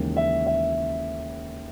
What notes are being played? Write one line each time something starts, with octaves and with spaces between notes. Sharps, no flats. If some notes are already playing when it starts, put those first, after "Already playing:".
Already playing: D#2 C#3 E3 G#3
E5
E5